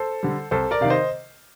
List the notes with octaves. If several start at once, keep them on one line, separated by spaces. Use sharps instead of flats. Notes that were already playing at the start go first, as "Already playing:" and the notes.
Already playing: A4 C5
D3 G3
C2 A4 C5
A#4 D5
C3 D#3 F5
C5 D#5